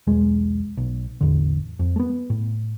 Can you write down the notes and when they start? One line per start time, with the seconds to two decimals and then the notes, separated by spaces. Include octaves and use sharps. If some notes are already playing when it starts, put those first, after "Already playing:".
0.07 B1 E2 G#3
0.77 B1
1.21 A1 E2 D3
1.79 F2
1.96 A3 B3
2.30 A2